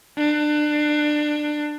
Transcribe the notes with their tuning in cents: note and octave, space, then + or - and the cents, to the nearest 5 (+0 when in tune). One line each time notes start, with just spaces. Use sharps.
D4 +25